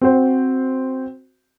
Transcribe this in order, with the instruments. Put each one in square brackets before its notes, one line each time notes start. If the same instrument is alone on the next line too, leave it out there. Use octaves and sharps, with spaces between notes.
[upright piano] C4 F#4 C5